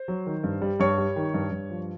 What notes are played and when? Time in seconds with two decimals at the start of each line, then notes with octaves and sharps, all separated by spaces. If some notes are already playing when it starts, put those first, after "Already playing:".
Already playing: C5
0.08 F#3
0.26 D#3
0.44 G2
0.62 G3
0.80 G2 C#5 C#6
0.98 G3
1.16 D#3
1.34 G2
1.52 G2
1.70 F3